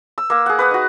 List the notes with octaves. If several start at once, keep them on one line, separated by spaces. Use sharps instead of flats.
E6
A#3 E6
G#4 F#5
B4 F#5 D#6
D#4 F#4